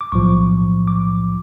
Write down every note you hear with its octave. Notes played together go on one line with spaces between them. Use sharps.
D6
B1 A2 F3 C#6
D6